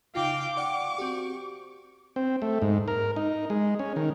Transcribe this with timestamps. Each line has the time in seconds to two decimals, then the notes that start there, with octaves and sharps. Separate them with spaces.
0.15 C#3 D#4 F4 F5 G5 D6
0.57 D5 F5 F#5 C#6
0.98 C4 F#4 G4
2.16 C4
2.42 A3
2.62 G#2
2.88 A#4
3.16 D#4
3.50 G#3
3.79 C#4
3.96 D#3